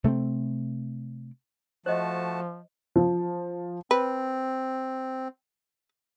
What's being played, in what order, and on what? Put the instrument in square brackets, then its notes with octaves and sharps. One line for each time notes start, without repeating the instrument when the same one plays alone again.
[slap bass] C3 A3 A#3 C4
[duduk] F3 [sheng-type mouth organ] A3 F#4 A5 [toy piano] C5 D#5
[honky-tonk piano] F3
[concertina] C4 [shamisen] B4